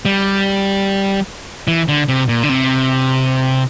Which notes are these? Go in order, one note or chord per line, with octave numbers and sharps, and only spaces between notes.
G3
E3
D3
C3
A#2
D3
C3